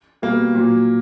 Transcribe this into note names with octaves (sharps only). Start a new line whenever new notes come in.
B2 G3 A#3
A#2 F#3